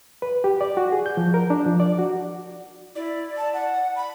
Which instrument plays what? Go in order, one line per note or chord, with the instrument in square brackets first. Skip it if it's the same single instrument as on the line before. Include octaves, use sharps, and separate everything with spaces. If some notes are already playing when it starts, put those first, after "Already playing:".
[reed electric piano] B4
G4
D5
F#4
G#4
G6
F3
A#4
D4
F3
D5
F#4
[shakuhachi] E4 [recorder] D5
[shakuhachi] A5
F#5
B5